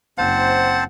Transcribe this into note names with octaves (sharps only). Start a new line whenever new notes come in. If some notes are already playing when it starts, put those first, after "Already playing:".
F#1 C4 C5 F#5 A5